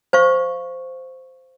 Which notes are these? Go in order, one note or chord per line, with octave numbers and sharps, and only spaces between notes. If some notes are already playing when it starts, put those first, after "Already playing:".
C5 F5 C#6